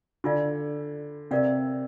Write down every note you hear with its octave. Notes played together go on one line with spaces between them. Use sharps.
D3 D4 F4 D5 F5
C3 A#4 D5 F5